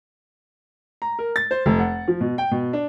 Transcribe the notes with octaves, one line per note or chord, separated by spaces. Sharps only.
A#5
A#4
A6
C5
F1
F#5
F3
B2
G5
B2
D4